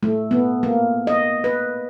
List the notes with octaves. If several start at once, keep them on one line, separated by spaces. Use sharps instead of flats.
A3
B3
A#3
D#5
B4